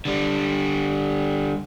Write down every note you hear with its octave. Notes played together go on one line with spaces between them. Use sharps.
D3 G3